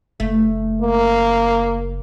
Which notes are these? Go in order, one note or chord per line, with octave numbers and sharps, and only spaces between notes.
F#1 A3
A#3